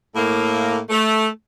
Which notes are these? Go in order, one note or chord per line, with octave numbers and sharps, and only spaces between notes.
A2 A#3
A3